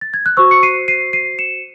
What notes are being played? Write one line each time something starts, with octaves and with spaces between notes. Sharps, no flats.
A6
G#6
F#6
F#4 C5 C#6 E6
C#7
C7 D#7
C7 D#7
C7 D#7
C#7 E7